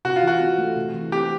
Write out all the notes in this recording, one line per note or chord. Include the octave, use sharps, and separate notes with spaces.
C3 F#4
F4
E3 F#4
C4
A3
C3
E3
C4 G4